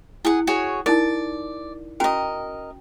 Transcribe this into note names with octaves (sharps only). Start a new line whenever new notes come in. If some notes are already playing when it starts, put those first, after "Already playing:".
E4 G#4 F#5
F#4 G#4 C#5
D#4 E4 A#4 D5
C#4 F#4 A#4 D#5 G5